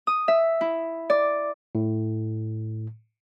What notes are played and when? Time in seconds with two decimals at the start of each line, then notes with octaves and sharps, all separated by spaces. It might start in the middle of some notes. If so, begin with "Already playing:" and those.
0.07 D#6
0.28 E5
0.61 E4
1.10 D5
1.75 A2